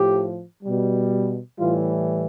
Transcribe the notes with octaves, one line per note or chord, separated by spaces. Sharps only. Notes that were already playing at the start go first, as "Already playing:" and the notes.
Already playing: A2 F3 G4
B2 G3
A2 E3 G3 F4